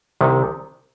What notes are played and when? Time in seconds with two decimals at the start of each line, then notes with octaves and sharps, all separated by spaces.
0.21 C2 C3 D#3